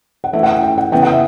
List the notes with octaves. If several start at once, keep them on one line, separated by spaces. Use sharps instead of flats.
F#5
E3 A3 E4 E5
F#5
G5
G5
F#5
C#3 E3 B3 G5
F#5
E5